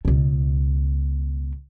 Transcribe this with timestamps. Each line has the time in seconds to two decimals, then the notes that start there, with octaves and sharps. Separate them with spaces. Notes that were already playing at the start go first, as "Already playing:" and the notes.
0.05 C#2 B2